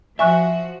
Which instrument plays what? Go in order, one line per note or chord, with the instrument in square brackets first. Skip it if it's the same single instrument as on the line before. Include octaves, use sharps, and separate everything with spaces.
[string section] F3 F#4 [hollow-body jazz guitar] E5 [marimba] G#5 C#6 F#6